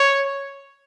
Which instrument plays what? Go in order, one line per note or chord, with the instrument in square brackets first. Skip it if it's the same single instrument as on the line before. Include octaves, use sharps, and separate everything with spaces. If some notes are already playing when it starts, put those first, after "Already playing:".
Already playing: [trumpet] C#5